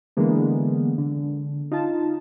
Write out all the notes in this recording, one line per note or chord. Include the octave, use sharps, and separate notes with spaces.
D3 E3 G#3 A#3 B3
D3
D#4 F4 A5